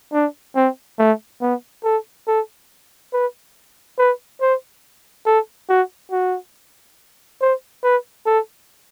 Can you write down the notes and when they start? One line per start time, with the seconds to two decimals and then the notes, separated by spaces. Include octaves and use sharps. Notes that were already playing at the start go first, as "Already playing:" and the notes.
0.13 D4
0.56 C4
0.99 A3
1.41 B3
1.84 A4
2.27 A4
3.13 B4
3.98 B4
4.41 C5
5.26 A4
5.69 F#4
6.12 F#4
7.41 C5
7.83 B4
8.26 A4